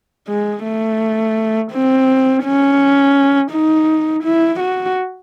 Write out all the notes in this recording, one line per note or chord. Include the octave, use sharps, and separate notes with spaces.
G#3
A3
C4
C#4
D#4
E4
F#4